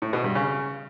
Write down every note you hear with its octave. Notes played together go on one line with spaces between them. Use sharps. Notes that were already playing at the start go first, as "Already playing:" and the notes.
A2
B2
G2
C#3